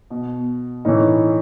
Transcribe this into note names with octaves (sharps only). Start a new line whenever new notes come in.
B2
A2 E3 C#4 D#4